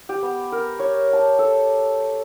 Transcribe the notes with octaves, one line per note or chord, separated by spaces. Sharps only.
G4
B3
A#4
C#5
A5
A4